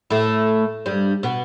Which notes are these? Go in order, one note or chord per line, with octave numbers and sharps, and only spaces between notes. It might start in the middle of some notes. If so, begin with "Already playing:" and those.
A2 A3
G2 G3
B2 B3